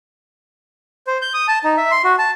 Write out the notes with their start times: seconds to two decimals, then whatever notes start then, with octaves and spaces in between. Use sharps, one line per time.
1.07 C5
1.22 G6
1.34 D#6
1.48 A5
1.64 D#4
1.77 E5
1.91 C6
2.04 F#4
2.19 A5